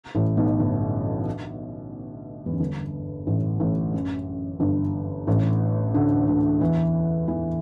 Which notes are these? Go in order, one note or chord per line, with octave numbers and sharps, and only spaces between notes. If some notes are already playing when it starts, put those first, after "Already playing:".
A1 A2
B1 B2
G1 G2
E2
F#2
G1 G2
A1 A2
A1 A2
F#2
G1 G2
A1 A2
D2 D3
D2 D3
E2 E3
E2 E3